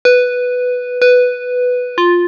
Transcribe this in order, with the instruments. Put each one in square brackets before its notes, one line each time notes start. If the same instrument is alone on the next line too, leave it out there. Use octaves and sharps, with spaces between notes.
[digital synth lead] B4
B4
F4